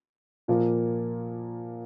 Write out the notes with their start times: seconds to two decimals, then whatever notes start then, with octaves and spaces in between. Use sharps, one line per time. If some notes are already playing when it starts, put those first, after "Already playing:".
0.48 A#2 F3 A#3